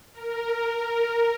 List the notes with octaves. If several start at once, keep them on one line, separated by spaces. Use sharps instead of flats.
A#4